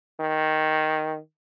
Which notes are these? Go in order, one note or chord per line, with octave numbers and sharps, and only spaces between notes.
D#3